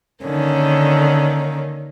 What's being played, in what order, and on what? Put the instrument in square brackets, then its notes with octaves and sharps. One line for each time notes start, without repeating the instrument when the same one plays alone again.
[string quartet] D3 D#3 A#3 C#4